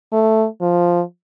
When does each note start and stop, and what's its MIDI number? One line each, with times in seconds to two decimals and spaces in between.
0.13 0.46 57
0.61 1.02 53